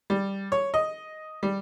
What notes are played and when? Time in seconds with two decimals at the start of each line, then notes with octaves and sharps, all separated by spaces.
0.10 G3
0.52 C#5
0.74 D#5
1.43 G3